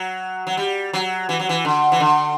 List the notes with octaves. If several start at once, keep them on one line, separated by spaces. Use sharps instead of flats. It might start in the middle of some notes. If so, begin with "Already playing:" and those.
Already playing: F#3
F#3
G3
F#3
E3
F#3
E3
D3
E3
D3